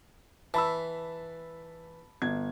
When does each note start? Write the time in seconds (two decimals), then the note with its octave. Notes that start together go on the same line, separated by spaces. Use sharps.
0.54 E3 A5 B5 E6
2.22 G1 G#6